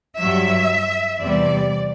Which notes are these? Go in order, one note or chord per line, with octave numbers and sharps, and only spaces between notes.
G2 F#3 E5
E2 C3 G3 D5